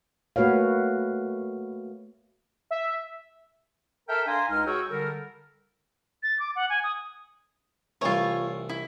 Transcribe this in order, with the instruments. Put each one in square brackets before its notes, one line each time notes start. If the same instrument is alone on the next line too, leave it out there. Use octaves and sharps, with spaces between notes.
[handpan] A3 A#3 F#4 B4 C#5 F5
[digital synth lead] E5
[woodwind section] A4 A#4 E5 G5 A5 F6
D4 F5 G#5 A#5 C6
C#2 D#4 F6
F#4 G#4 C#5 G5 C#6 E6
D3 G3 A4 A#4
[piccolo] A6
D6
F#5
G#5
D#6
[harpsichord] C2 E3 A3 [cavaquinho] F4 C#5
[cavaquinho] E4